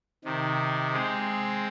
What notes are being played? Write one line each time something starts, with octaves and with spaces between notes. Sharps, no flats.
C3 D#3
G#3 C4